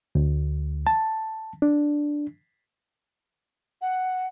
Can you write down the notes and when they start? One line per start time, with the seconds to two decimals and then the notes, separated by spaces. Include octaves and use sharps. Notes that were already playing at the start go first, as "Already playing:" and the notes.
0.15 D2
0.87 A5
1.62 D4
3.81 F#5